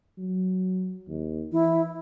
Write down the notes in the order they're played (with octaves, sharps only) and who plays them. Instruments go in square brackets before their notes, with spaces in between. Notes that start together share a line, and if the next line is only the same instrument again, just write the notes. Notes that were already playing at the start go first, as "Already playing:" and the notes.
[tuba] F#3
D#2
[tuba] E3 [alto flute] E4